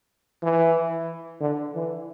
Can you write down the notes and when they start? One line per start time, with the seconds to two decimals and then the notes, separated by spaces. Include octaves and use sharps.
0.43 E3
1.41 D3
1.75 E3